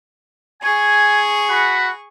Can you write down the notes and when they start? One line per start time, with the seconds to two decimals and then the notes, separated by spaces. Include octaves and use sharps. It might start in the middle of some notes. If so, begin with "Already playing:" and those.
0.63 G#4 G#5 C#6
1.50 F#4 F#5 B5